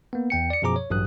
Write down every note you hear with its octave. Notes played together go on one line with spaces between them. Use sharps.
A#3 B3
E2 G5 C#7
D5 C#7
F#2 B2 F3 G#4 A#5 D6
C#5
A1 G2 F#3 D#6 F#6